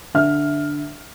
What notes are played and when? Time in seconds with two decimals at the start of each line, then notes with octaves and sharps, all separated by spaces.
0.14 D3 E5 F6